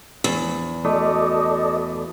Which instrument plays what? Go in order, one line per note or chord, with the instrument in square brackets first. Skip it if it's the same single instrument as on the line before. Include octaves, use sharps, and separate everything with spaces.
[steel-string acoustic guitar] E2 [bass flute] F3
[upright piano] A3 [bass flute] F#4 [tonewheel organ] A4 D5 D#5